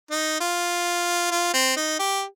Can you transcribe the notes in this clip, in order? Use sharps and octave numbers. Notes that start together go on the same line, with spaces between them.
D#4
F4
F4
C4
D#4
G4